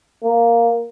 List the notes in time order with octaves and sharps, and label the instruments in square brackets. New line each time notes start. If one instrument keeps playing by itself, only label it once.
[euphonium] A#3